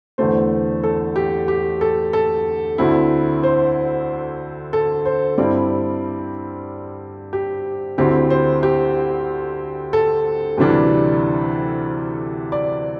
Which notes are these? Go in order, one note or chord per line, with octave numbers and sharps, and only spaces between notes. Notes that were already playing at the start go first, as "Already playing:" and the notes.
E2 D3 A3 C5
A4
G4
G4
A4
A4
D2 D3 C4 E4
C5
A4
C5
G2 G3 C4 E4 D5
G4
D2 D3 C4 E4 G4
C5
G4
A4
D2 C3 E3 G3 D4
D5